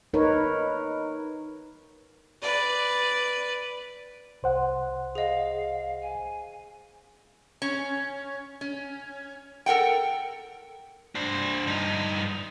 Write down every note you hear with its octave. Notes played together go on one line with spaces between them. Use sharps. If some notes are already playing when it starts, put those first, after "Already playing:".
D#4 A#4 B4 C#5
B4 D5
C2 C5 F#5
G#4 D#5 F5
G#5
C#4
C#4
A4 A#4 F#5 G5
D4 C5
G2 D#4